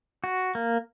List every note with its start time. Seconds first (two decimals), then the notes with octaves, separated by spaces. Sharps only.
0.24 F#4
0.55 A#3